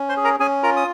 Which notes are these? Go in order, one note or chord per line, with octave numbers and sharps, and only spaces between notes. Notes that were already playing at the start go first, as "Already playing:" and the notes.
Already playing: C#4
C5 C6
G#4
A#4 A#5
C#4 G#4 G#5
F4 A#4 A#5
D#6